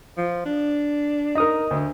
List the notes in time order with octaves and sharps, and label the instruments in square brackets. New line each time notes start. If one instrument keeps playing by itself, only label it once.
[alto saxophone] F3
D4
[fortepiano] D#4 A#4 [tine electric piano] D#5 D#6
[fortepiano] D2